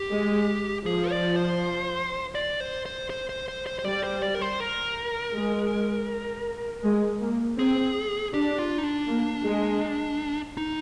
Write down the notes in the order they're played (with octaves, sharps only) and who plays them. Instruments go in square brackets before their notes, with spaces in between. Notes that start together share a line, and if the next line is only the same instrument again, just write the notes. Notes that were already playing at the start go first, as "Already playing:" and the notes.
Already playing: [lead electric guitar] G4
[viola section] G#3
[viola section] F3 [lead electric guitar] G#4
[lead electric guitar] D5
C5
D5
C5
C5
C5
C5
C5
C5
C5
[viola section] G3 [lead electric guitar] D5
[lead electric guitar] C5
D5
A#4
C5
A#4
[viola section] G#3
G#3
A#3
[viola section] C4 [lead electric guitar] G#4
[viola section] D4 [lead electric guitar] G4
[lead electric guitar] F4
D#4
D4
[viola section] A#3
G#3
[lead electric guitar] D#4